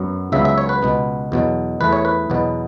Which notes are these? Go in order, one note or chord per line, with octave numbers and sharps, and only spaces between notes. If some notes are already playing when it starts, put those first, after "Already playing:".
Already playing: F#2 F#3 B3
C#2 C#3 F#3 B3 E5
E5
C#5
B4
C#2 B2 B3
E2 B2 F#3
E2 E3 A3 B4
C#5
B4
E2 B2 F#3 B3